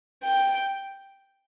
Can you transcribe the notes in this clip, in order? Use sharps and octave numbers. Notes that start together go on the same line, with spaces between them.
G5